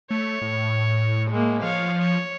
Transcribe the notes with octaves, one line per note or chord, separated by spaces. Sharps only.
A3 C#5
A2
G#3 A#3
F3 C#5 F5
C#5